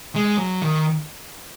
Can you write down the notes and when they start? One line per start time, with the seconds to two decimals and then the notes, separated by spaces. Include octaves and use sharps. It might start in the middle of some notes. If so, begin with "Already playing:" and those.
0.15 G#3
0.38 F#3
0.62 D#3